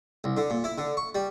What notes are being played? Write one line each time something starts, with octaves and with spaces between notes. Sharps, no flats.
C2
D3
A#2
E4
D3
C#6
G3